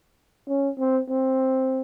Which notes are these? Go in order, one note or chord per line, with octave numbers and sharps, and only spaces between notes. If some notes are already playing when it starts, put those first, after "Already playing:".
C#4
C4
C4